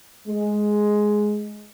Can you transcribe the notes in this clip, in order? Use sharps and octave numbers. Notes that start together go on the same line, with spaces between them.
G#3